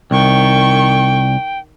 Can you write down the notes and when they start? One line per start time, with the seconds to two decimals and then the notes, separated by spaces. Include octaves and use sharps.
0.11 C2 D#3 G5 C#6